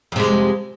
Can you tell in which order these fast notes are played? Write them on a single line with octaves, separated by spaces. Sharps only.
F2 C3 G#3